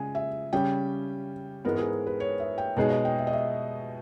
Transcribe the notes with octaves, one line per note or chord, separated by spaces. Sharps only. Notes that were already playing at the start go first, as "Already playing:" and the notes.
Already playing: C#3 G#3 G#5
E5
C#3 G3 C#4 G4 G5
G#2 E3 G#3 B3 A#4
G#4
B4
C#5
E5
G5
B2 G#3 D#4 G#4 C#5
D#5
G5
E5
D#5
E5